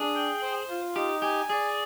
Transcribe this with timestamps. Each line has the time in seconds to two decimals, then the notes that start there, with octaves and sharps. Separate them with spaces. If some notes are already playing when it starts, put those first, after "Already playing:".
Already playing: D4 G#4
0.15 G5
0.42 C5
0.68 F4
0.95 D#4 G4
1.22 G4 G#5
1.49 G#4 D5